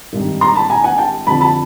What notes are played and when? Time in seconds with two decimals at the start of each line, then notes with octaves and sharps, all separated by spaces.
0.13 G#1 G2 D#3
0.41 A#5 C6
0.55 A5 B5
0.70 G#5 A#5
0.84 F#5 G#5
0.98 G5 A5
1.27 F2 D3 F3 A5 B5
1.41 A5 B5